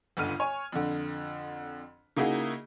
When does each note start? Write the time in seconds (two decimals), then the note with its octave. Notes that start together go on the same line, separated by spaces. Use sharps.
0.17 G1 C#2 D3 F6 D#7
0.40 C#5 G#5
0.72 F2 D3
2.17 C#3 A#3 D#4 E4 F#4 G#4